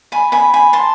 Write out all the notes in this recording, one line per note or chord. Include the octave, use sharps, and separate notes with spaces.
G#5 B5
G#5 B5
G#5 B5
A5 C6